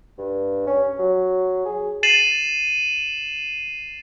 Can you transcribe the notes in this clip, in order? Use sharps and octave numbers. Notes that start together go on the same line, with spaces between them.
G2
C#4
F#3
G#4
A6 C7 D#7 E7 F#7